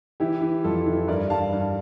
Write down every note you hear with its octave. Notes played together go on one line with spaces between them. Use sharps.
E3 E4 G4
E3
F2 F4 A4
E3
G2 A#4 D5
G2 F5 A5
G2